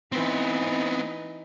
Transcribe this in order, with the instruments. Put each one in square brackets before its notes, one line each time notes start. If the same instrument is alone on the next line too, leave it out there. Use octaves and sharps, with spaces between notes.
[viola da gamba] E3 D#4 [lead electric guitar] B3 C4